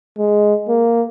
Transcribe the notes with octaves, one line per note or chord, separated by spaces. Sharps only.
G#3
A#3